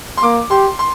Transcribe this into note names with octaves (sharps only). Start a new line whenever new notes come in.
C6
A#3 D6
G4 C6
C6